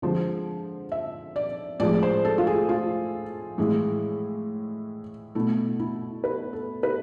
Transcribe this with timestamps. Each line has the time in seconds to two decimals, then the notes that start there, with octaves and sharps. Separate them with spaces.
0.02 D3 F3 G#3 C5
0.92 E5
1.36 D5
1.80 A2 F3 G#3 D5
2.03 C5
2.25 A4
2.38 F4
2.47 G#4
2.69 F4
3.58 A2 E3 G#3
5.35 B2 A3 E4
5.79 E4
6.24 B4
6.53 A4
6.83 B4